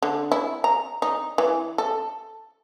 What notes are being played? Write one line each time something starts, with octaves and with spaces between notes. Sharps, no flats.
D3
E4
A#5
D#4
E3
A4